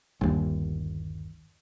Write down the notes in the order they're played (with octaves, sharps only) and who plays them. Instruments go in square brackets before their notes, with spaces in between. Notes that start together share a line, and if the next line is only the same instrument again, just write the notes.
[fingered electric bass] G1 D#2